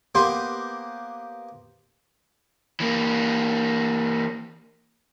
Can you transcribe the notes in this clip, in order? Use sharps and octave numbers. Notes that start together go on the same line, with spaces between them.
A#3 B3 G4 B4 C5
E3 A#3